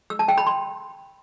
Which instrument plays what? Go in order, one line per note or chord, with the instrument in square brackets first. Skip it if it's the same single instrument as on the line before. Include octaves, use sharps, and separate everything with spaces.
[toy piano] E6
A5
G5
B5
C6